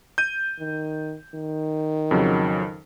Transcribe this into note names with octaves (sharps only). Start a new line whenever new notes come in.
G6 D#7
D#3
D#3
F2 C#3 F#3